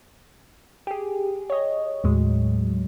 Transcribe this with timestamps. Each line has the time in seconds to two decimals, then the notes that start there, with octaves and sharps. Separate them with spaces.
0.87 G4 G#4
1.50 C#5 D#5
2.04 D#2 A2 F#3 G#3